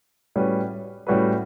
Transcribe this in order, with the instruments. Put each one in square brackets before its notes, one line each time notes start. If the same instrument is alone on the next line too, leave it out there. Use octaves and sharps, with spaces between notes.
[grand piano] A2 G3 C#4 F#4 B4
A2 G3 C#4 F#4 B4